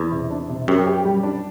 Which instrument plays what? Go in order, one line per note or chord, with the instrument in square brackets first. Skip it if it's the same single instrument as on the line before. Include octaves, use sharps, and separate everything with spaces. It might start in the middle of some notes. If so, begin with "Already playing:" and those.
Already playing: [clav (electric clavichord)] E2
[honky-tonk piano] C3
D4
C3
[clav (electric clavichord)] F#2 [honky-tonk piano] G4
[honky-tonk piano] G4
G3
D4